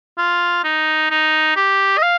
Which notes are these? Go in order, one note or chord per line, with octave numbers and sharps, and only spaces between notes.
F4
D#4
D#4
G4
D#5
F5